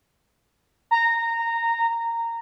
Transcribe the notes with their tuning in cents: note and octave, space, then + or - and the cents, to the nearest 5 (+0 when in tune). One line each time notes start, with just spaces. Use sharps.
A#5 -15